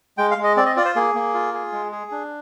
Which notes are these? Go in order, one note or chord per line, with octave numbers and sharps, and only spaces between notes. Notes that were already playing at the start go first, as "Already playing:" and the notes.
G#3 G5
F5
G#3
D#5
C4 D5
D#5
F4 D5
C5
A#3 G#4
A#3
F4
G#4
G#3
G#4
D4